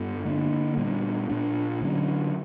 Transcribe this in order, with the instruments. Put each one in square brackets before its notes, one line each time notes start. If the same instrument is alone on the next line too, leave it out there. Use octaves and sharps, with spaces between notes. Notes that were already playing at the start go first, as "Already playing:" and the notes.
Already playing: [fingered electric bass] G2 B3
D3 A#3 D4
A#2 G3 B3 D4
A#2 A#3 D4
D3 F#3 C#4